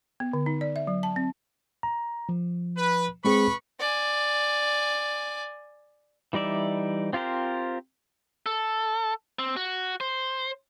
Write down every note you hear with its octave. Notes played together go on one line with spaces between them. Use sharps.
B3
D3
D#4
D5
E5
F#3
A5
C4
A#5
F3
B4
G#3 C4 G#4 B4 B5 C#6
D5 G#5
E3 G3 D#4 D5 E5
C4 F4 G4 A#4 C5
A4
C4
F#4
C5